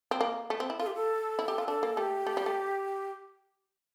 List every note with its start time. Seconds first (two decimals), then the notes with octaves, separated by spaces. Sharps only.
0.11 C4
0.21 A#3
0.50 A3
0.60 C4
0.70 E4
0.80 F4 A4
0.87 G4
0.95 A4
1.39 E4
1.48 G4
1.58 F4
1.68 D4 A4
1.83 A#3
1.97 A3 G4
2.27 A3
2.37 G3
2.46 A3